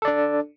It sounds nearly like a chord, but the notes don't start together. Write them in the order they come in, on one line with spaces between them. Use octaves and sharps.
A4 D5 D4